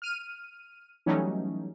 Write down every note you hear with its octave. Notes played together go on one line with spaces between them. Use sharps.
F6 D#7
E3 F#3 G3 A3 C#4 D#4